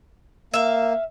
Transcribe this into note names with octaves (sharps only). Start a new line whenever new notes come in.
A#3 E5 F5